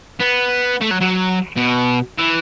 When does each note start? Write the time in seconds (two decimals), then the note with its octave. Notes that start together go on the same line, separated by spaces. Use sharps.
0.20 B3
0.81 A3
0.91 F#3
1.01 F#3
1.56 B2
2.18 E3